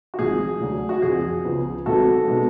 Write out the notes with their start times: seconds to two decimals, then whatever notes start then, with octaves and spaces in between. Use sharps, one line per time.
0.14 F#4
0.18 G#1 G#2 F3 G#4
0.60 D2 D3 F#3
0.89 F#4
1.02 F#1 F2 F3 G#4
1.45 C#2 C#3 F3 B3
1.86 G#1 G#2 F#3 B3 F#4 A4
2.28 B2 G#3 B3